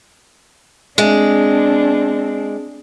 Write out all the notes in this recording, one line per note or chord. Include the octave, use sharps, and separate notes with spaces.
G#3 C4 D4